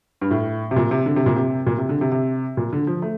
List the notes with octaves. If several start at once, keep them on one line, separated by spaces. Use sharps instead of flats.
G2
A2
C3
A#2
C3
D3
C3
A#2
C3
A#2
C3
D3
C3
C3
A#2
D3
F3
A3